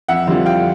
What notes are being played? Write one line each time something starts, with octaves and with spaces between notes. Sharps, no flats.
F2 E5 F#5
D3 G3 C4 F4
F2 F5 G5